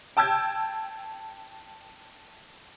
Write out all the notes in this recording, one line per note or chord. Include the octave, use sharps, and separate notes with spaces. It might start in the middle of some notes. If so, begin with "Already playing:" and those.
G5 A5 E6 G6 G#6